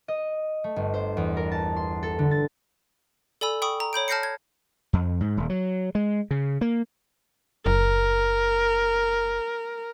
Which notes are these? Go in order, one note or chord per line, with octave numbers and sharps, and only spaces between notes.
D#5
A3
G1
C5
E2
A#4
A5
C6
A4
D3
A6
A4 D5 G#5 B5 E6
G5 B5 C#6 D#6
A#5
C#5 B5 G6 D7
A5 F6 G6 A#6 C7 C#7
G#6
F2
G#2
D#1
F#3
G#3
C#3
A#3
F#1 A#4